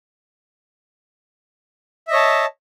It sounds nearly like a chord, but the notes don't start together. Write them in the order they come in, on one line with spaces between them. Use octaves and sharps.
E5 D#5 C#5 A5